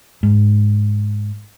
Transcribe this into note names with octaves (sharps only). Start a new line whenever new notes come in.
G#2